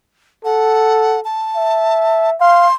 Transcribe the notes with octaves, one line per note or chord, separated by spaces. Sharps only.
A4 F#5
A5
E5
F5 C6